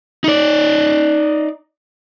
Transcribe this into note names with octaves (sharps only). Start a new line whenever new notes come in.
D#4 D5